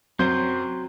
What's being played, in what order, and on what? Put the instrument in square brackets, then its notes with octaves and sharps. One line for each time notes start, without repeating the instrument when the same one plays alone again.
[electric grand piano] F#2 C5 [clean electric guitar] F#3 [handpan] C4 [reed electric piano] C6 G6